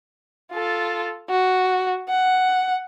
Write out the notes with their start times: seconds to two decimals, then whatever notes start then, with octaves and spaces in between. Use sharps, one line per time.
0.52 F4 A4
1.30 F#4
2.09 F#5